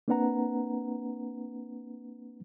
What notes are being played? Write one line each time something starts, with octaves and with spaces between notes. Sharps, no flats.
A#3 C4 D4 B4 F#5 A#5